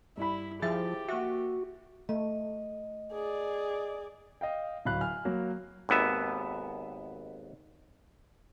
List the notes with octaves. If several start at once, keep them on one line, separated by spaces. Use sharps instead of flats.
G2 E4 B5
F3 E4 G4 G#4 E5 A6
A#3 F#4 E5
A3 D#5
G#4 D5
D#5 F5 G5
D1 F#3 F5 B5 F#6
G#5 F6
F#3 A#3
G#1 D#2 B3 E5